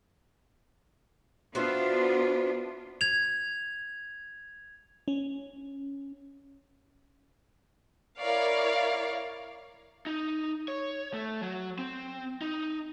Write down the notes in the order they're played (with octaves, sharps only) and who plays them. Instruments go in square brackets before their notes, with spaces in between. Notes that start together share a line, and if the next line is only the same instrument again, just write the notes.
[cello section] B3 D4 F4 [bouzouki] F#4 C5 E5
[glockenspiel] G#6 F7
[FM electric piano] C#4
[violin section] E4 A#4 C#5 D5 F5
[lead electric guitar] D#4
C#5
A3
F#3
C4
D#4